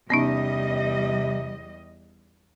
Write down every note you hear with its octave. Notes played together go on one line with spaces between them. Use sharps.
E2 C3 G3 B3 C#4 D#4 D#5